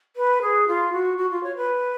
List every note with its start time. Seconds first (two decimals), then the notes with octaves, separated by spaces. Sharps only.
0.16 B4
0.41 G#4
0.67 F4
0.92 F#4
1.17 F#4
1.30 F4
1.43 C#5
1.56 B4